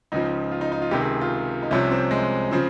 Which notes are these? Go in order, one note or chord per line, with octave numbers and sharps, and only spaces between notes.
C#2 C#3 F3 D#4
F4
D#4
D#4
F4
C#2 C3 D#3 G4
G#4
F4
D#4
C2 C3 F3 C#4
C4
G#3
C#3 F3 C4